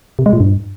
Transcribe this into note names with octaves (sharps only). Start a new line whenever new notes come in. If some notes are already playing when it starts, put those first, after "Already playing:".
C3
G#3
A#2
G2